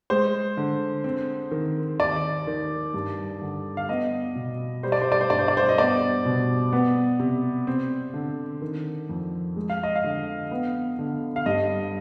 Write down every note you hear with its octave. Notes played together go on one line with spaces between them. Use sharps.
G#3 C5
D3
C4
D#3
D#2 D5
D#3
G2
D3
F5
B3 D#5
B2
G3 C5
D5
C5
D5
C5
G2 D5
C5
D5
C5
D#5
B3 D5
B2
B3
C3
C4
D3
D#3
F2
G#3
F5
D#5
F5
D3
B3
D3
F5
G2 D#5